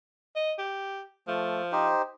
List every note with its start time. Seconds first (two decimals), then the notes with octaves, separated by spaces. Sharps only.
0.36 D#5
0.58 G4
1.27 F3 A3
1.72 D#4 G4 C5